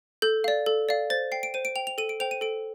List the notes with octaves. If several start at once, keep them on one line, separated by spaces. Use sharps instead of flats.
A4 G6
D5 F5
A4
D5 F5
C5 A6
G5 C7
D7
C5 D#7
D7
G5 F7
F7
A4 D#7
D7
C5 G5 F7
D#7
A4 D7